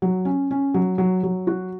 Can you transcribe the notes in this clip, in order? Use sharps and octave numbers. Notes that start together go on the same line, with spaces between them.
F#3
C#4
C#4
F#3
F#3
F#3
F#4